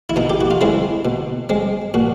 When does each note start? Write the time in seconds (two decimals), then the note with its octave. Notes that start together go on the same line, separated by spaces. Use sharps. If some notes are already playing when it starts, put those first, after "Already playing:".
0.10 E4
0.16 B2 D#4
0.30 G4
0.41 F#4
0.51 F4
0.61 G#3 C4 E4
1.05 B2
1.49 G#3 C4
1.94 A#2 F#4